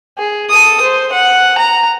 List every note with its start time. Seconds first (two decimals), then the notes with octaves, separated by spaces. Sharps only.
0.18 G#4
0.50 A4 D#6
0.82 C5
1.12 F#5
1.58 A#5